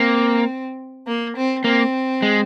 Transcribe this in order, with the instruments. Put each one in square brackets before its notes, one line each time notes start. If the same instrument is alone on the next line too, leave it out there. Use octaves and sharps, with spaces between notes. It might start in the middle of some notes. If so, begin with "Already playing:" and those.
Already playing: [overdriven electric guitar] A#3 [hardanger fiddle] C4
[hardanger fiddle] A#3
C4
[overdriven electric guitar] A#3 [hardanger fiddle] C4
[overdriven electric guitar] G#3